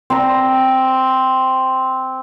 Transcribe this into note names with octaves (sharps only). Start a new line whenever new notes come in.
C4 A#5